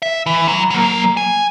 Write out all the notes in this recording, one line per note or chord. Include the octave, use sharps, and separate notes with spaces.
E5
E3
F#3
F#3 A#3
G#5